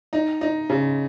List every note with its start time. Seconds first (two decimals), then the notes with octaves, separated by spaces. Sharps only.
0.13 D#4
0.41 D#4
0.70 C#3